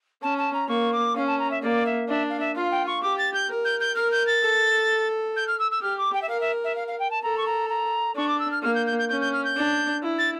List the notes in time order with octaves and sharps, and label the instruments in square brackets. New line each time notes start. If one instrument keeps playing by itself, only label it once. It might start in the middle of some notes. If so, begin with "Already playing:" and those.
[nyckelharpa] C#4 [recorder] A5
[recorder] A5
A#5
[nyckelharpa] A#3 [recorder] C#6
[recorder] D6
[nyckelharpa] C#4 [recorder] F5
[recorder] A5
A#5
E5
[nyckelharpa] A#3 [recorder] D5
[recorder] E5
[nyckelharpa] D4 [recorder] E5
[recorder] F5
E5
[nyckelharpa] F4 [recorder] F5
[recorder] G5
C#6
[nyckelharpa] G4 [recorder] D6
[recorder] A6
G6
[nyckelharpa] A#4
[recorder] G6
G6
[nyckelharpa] A#4 [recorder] F6
[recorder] G6
A6
[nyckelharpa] A4
[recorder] G6
F6
E6
E6
[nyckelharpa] G4 [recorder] F6
[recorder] D6
G5
E5
[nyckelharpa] A#4 [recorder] F5
[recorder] E5
E5
F5
F5
G5
A5
[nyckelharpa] A4 [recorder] A#5
[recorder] C#6
A#5
A#5
[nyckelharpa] D4 [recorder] C#6
[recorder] D6
E6
F6
[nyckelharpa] A#3 [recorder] F6
[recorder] G6
G6
G6
[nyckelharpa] C#4 [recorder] G6
[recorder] G6
F6
G6
[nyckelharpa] D4
E4
[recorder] A6